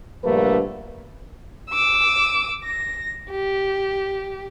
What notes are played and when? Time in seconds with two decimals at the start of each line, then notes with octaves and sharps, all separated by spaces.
0.24 A#1 G2 D3 A3 A#3 B4
1.70 D6 E6
2.65 A#6
3.31 G4